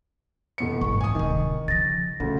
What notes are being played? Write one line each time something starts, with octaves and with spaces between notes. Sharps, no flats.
F1 E2 C#7
G#1 G2 C#6
C#2 G#2 G#5 D#6
D1 C3 D#3
C#3 F3 A6 A#6
D2 C#3 E4